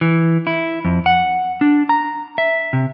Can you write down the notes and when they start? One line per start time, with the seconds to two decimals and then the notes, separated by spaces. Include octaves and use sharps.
0.01 E3
0.47 E4
0.85 F2
1.06 F#5
1.61 D4
1.89 A#5
2.38 E5
2.73 C3